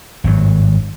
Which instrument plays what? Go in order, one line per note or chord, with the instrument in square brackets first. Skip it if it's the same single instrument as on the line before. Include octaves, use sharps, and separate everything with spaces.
[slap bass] G#1 G2 F#3